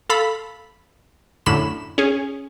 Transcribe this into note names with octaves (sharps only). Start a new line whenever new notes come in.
A4 F5 B5
F#2 A2 D3 B5 E7
C#4 G#4